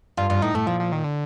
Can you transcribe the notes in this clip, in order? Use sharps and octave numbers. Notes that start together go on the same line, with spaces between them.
G2 F4
G2 F4
A2 D#4
A2 A3
A#2 F3
F3
D#3
D3